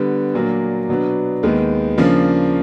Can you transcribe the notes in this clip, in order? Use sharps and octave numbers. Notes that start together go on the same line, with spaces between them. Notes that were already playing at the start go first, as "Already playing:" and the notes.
Already playing: D3 G3 B3
A#2 F#3 A#3 D4
B2 F#3 B3 D4
D#2 D#3 G#3 B3
C#3 F3 A#3 D4